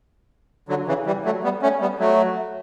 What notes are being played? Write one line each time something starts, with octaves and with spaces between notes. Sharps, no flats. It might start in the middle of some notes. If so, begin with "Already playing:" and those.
D3 F#3
C#3 E3
E3 G3
F#3 A3
G3 B3
A3 C#4
G3 B3
F#3 A3